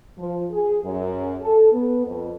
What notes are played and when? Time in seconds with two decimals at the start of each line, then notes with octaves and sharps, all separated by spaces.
0.18 F3
0.51 G#4
0.84 F#2
1.42 A4
1.72 B3
2.06 F2